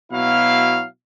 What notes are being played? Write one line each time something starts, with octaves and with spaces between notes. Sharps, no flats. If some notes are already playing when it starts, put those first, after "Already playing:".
B2 F#3 E4 F5